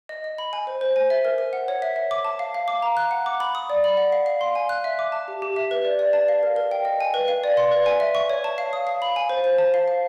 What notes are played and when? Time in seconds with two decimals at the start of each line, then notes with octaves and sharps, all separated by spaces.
0.09 D#5
0.24 D#5
0.38 B5
0.53 G#5
0.67 C5
0.81 C5
0.96 G#5
1.10 E5
1.25 A#4
1.38 A#4
1.53 F#5
1.68 C#5
1.82 E5
1.96 E5
2.11 D6
2.25 A5
2.39 F5
2.54 F5
2.68 D6
2.82 A#5
2.97 F#6
3.11 F#5
3.26 D6
3.40 B5
3.55 D#6
3.70 D5
3.84 B5
3.97 F#5
4.12 F5
4.26 F5
4.41 C6
4.55 G#5
4.69 F#6
4.84 E5
4.99 D6
5.12 A5
5.28 G4
5.42 G4
5.56 E5
5.71 B4
5.85 D5
5.99 D5
6.13 A5
6.28 F5
6.43 A#4
6.56 A#4
6.71 G5
6.85 D#5
7.01 G#5
7.14 B4
7.28 F5
7.44 D5
7.57 C6
7.71 B4
7.86 G#5
8.00 E5
8.15 C#6
8.30 C#5
8.44 A5
8.58 F5
8.73 D#6
8.87 F5
9.02 B5
9.16 G#5
9.29 C5
9.44 C5
9.58 A5
9.74 F5
9.88 F5